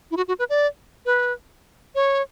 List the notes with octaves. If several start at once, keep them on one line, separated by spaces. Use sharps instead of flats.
E4
F#4
F#4
B4
D5
B4
C#5